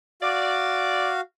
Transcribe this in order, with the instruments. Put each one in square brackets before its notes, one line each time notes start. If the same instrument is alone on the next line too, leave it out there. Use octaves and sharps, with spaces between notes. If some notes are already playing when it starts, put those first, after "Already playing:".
[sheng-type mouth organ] F#4 F5 [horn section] D5